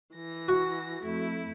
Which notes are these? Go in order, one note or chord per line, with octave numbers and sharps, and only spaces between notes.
E3 A#6
F#4
F2 A3 E4